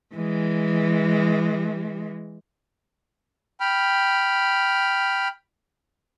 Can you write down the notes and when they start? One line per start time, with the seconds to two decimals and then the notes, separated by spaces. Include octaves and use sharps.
0.15 E3 G#3
3.60 G5 B5 F6